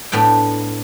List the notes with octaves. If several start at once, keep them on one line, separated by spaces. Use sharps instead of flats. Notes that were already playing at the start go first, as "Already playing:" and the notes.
A2 B3 D4 G5